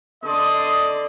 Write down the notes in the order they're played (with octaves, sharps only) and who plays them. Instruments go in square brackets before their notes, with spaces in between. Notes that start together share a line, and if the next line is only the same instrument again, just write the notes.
[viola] D3 D5 [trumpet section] D#5 C6 D#6